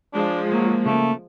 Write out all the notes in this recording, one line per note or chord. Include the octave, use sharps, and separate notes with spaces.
F3 G#3 D4
F#3 A#3
C#3 A3 A#3